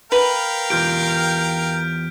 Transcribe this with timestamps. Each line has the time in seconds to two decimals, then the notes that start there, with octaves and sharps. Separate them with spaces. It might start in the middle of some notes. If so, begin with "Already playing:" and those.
0.12 A#4 B4 F5 G5 B6
0.70 E2 F4 G4 F6 G6 D7